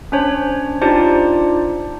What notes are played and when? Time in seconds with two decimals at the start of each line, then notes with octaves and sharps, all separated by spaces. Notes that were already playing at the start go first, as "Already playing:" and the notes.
0.12 C#4 D4 C5 C#5
0.82 D4 D#4 F4 G4 C5 D5